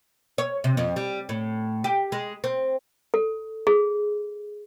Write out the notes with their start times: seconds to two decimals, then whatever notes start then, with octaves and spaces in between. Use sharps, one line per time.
0.38 C#5
0.64 C3
0.77 F2
0.96 G3
1.29 A2
1.84 G4
2.12 G#3
2.44 C4
3.14 A4
3.67 G#4